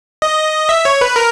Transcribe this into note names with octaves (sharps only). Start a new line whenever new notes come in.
D#5
E5
C#5
B4
A#4